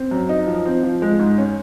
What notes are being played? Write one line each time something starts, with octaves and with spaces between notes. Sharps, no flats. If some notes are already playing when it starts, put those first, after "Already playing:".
Already playing: C4
F#2
D#4
F3
C4
F3
G#3
G#2
C#4